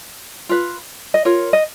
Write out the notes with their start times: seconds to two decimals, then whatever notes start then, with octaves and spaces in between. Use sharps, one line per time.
0.49 F4 B4
1.14 D#5
1.25 F4 A#4 C#5
1.53 D#5